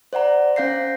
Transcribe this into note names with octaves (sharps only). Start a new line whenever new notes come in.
C5 D5 F#5 A#5
C#4 C5 F5 G6 A#6 C7